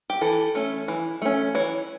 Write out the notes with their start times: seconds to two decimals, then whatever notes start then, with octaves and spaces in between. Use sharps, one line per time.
0.10 G4
0.21 E3 A4
0.55 A3 C#4
0.88 E3
1.22 A3 C#4
1.55 E3 C#5